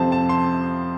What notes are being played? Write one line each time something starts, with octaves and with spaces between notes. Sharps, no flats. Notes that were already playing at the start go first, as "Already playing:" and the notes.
Already playing: F2 C3 F3 C4 C5 A5
A5
C6